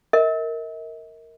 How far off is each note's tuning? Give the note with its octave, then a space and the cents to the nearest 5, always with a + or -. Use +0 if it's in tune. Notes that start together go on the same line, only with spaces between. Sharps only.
A#4 -10 D#5 +45